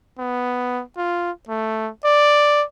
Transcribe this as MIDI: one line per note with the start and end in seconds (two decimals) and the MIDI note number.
0.19 0.83 59
0.97 1.31 65
1.49 1.90 57
2.05 2.64 74